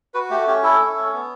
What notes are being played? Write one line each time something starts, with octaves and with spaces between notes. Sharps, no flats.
F#4 B4
A3 G4
C#4 G4
E4 A4
A3
C#4
B3